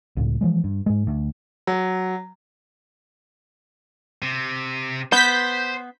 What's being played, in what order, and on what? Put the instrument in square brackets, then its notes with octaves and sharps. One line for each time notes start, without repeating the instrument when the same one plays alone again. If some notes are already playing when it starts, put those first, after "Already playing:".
[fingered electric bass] C#2 A2
E3 F3 G#3
G2
G#2 G#3
D2
[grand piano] F#3
[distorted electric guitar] C3
[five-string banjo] B3 [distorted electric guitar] C5 [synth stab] G6 B6